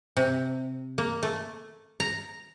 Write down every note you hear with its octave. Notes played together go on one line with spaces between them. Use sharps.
C3
A#3
A3
A#5